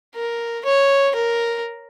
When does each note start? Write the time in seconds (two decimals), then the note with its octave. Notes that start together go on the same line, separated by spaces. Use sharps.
0.15 A#4
0.65 C#5
1.15 A#4